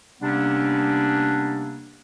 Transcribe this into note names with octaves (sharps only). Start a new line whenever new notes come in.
C3 G3 A#3 B3 C#4 D4